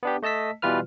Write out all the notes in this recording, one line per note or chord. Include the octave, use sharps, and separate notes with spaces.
B3 D4 G4
A3 D#5 A5 E6 B6
B2 E3 G3 F4 B4 F6